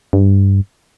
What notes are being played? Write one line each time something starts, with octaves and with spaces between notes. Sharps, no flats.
G2